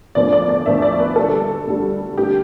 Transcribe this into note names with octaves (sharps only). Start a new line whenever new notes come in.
E2 D3 F3 A3 D5
D5
D5
E2 D3 F3 A3 E5
D5
B4
D2 D3 G3 A4
D2 D3 G3
D3 A3 G4